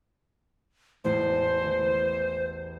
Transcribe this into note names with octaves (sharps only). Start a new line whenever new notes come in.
A1 E2 C5
E3